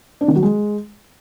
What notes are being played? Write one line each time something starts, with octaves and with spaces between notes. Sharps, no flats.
D4
D#3
F#3
G#3